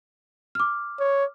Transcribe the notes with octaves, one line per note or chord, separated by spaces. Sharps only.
D6 F6
C#5